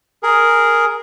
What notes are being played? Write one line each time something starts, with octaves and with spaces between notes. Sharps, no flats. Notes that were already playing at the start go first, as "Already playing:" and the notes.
G#4 A#4